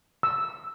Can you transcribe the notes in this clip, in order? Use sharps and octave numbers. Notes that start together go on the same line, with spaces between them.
E6